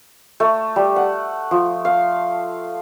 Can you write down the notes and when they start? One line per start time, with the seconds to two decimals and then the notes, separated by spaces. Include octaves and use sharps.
0.40 A3
0.76 G3
0.96 F#5
1.51 F3
1.85 F5